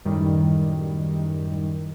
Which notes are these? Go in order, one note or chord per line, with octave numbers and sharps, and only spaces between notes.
F#2 A2 D#3 G3